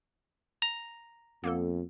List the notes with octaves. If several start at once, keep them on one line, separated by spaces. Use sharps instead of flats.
A#5
F2 A#3 B3 A4